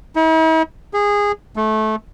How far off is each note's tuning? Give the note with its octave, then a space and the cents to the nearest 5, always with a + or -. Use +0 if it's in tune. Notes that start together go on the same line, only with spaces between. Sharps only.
E4 -45
G#4 -20
A3 -20